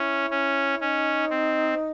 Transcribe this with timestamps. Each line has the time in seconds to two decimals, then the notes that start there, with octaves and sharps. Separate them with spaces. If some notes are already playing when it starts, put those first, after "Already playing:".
Already playing: C#4 E4
0.31 C#4
0.81 C#4 D#4
1.30 C4